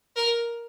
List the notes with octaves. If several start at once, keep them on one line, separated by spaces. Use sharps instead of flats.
A#4